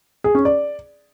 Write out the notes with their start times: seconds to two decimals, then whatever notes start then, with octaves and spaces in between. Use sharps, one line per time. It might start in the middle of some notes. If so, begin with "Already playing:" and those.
0.24 G#4
0.35 C#4
0.45 D5